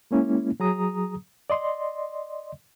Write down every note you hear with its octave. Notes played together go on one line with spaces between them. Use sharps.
G#3 A#3 C#4 E4
F#3 G#4 A#5 D#6
D5 D#5 C6